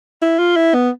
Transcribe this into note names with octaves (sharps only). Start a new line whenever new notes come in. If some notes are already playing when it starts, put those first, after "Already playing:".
E4
F4
E4
B3